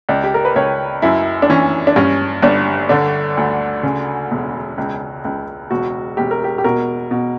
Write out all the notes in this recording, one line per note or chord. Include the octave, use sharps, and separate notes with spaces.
C#2 D5
G4
A#4
B4
C#2 C#5
F#2 E4
D4
E3 C#4
D4
G2 C#4
G1 D4
D3 D4
D2
C#3
E1
C#2
C#2
E1 F#4
E1 G4
A#4
G4
G4
B2 A#4
B2